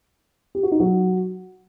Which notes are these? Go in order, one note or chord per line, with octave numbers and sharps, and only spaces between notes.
G4
F#4
D#4
F#3 F#4